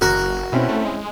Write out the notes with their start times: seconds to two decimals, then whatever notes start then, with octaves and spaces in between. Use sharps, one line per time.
0.01 F#1 F#4 A#4
0.52 B2 C4 C#4 E4
0.69 A3
0.85 G#3